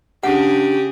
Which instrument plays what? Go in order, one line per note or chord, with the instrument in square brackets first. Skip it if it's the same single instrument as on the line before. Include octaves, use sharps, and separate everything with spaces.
[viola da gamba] C#3 G#4 [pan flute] D4 [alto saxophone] G4 [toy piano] F#5